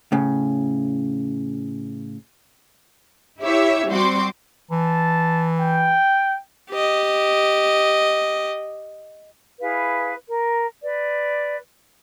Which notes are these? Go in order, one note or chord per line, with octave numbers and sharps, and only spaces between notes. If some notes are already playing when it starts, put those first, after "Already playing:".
A2 C#3
E4 G4 C#5 E5
G3 C4 F#4 C6 D6
E3 A5
G5
G4 D#5
E4 G#4 B4 F5
A#4
B4 D5